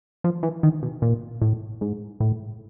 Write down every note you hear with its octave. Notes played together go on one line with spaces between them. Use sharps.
F3
E3
D#3
B2
A#2
A2
G#2
A2